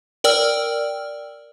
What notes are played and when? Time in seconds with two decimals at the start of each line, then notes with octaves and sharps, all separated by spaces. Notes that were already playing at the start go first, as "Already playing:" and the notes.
0.24 A#4 D5 G5 E6 F6